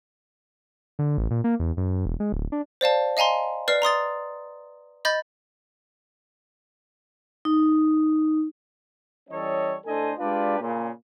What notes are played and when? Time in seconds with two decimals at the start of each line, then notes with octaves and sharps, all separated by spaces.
0.99 D3
1.18 A1
1.31 A#2
1.44 A#3
1.60 E2
1.77 F#2
2.06 E1
2.20 G#3
2.32 D1
2.52 D4
2.81 C5 D5 F5 A5
3.17 D#5 F5 G#5 A#5 C6
3.68 B4 D5 F6 C7
3.82 A#5 C6 D#6 A6
5.05 D#5 B5 G6 A6
7.45 D#4
9.30 E3 G3 C#4 A4 C#5 D#5
9.86 A2 D4 A4 C5 D#5 G#5
10.18 G#3 D4 F4 G4 B4 D5
10.60 A#2 C#3